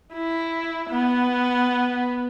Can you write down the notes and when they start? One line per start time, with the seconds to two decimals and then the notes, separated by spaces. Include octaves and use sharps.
0.14 E4
0.90 B3